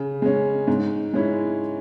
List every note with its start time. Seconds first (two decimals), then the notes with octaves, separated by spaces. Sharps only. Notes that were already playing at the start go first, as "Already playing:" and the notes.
Already playing: C#3
0.22 G#3 C#4
0.67 G#2
1.14 G#3 C#4 E4